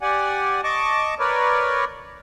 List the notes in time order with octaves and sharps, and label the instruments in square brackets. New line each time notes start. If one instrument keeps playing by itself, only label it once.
[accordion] G4 D5 F#5 G#5
D#5 A5 C#6 D6
A#4 B4 C#5 D5